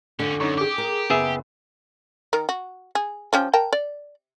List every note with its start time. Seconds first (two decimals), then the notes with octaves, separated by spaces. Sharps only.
0.19 F2 D3 C#4
0.40 F#2 C#4 D#4 C#6
0.57 G4 G#4 D6
0.78 A#4
1.10 F#1 B3 G#4 E5
2.33 D#3 A#4
2.49 F#4
2.95 G#4
3.33 F3 C#4 G4
3.53 A#4 G5 A5
3.73 D5